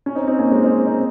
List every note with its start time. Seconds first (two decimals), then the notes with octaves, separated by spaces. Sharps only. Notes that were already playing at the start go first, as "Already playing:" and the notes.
0.06 C#4
0.15 C4 D#4
0.27 C4 D#4
0.39 A#3 C#4
0.51 G#3 C4
0.63 C4 D#4
0.87 C4 D#4